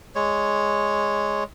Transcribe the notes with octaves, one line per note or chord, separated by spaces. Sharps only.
G#3 C#5